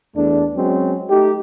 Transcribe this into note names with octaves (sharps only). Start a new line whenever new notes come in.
E2 A3 D4
F#3 G#3 C4 C#4
A3 D#4 G4